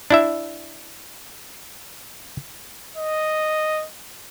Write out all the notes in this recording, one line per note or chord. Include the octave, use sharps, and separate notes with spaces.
D4 E4 E5
D#5